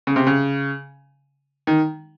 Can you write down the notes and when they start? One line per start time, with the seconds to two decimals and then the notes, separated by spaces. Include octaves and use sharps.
0.07 C#3
0.16 C3
0.27 C#3
1.67 D#3